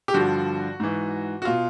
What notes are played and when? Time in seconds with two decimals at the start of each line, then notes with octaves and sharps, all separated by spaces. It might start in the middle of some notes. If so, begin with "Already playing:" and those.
0.08 G4
0.14 G2 D3 F3 F#4
0.80 G#2 E3
1.42 F#4
1.45 B2 F4